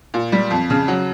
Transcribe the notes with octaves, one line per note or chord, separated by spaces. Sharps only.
A#2
G3
F2
C#3
F#3